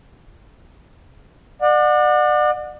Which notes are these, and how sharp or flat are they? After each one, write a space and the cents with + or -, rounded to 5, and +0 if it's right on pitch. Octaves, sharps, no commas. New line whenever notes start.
D5 +35 F#5 -25